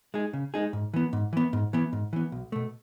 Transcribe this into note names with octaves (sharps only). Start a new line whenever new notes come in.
G#3 D#4 G#4
C#3
G#3 D#4 G#4
G#2
E3 B3
G#2
E3 B3
G#2
E3 B3
G#2
E3 B3
B1
B2 A3